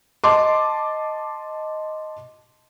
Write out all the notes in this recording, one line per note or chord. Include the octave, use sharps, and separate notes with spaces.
D#5 A5 C6 D6